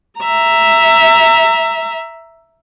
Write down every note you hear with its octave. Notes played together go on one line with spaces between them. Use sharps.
E5 A#5